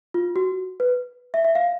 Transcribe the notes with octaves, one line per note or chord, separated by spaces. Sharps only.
F4
F#4
B4
E5
E5
F5